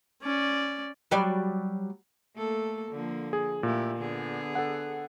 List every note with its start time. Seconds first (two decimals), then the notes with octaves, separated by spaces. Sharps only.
0.23 C#4 D5
1.11 F#3 G3 D5
2.35 A3 A#3 A4
2.91 D3 F3 A#3
3.33 G#4
3.63 A#2 A3 E4 G4
3.97 D3 B3 G#4
4.55 A4 F#5